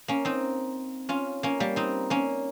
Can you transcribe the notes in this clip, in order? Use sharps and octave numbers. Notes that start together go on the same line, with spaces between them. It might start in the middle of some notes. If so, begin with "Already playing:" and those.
A#3 C#4
C4 D#4
C#4 F4
A#3 C#4
G3 A#3
C4 D#4
A#3 C#4